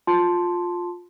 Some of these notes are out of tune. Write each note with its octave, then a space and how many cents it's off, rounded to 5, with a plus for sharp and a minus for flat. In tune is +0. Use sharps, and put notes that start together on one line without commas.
F4 +15 A5 +0 C6 +0